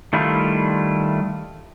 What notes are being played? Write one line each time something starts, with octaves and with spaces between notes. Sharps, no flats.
D#3 G3 A3 E4 F4